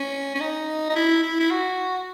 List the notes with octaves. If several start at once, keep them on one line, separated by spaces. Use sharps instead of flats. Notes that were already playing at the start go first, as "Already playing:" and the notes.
Already playing: C#4
C#4
D#4
D#4
E4
E4
E4
F#4